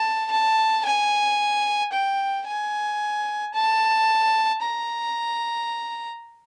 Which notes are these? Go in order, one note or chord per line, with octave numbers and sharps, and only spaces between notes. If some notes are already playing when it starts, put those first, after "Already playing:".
Already playing: A5
A5
G#5
G5
G#5
A5
A#5